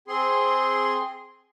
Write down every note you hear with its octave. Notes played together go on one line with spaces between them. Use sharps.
C4 G#4 C6